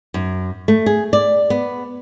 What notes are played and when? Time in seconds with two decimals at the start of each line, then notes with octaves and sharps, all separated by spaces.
0.14 F#2
0.68 A3
0.86 G#4
1.13 D5
1.50 B3